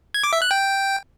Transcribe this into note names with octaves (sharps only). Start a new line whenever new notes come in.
G#6
D6
E5
F#6
G5